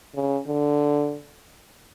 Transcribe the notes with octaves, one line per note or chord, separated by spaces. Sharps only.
C#3
D3